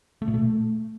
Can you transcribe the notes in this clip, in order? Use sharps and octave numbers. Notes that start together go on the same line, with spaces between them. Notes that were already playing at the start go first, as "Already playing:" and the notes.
A3
A#2
A3